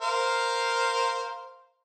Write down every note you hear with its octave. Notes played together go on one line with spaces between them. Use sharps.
A#4 C5 F5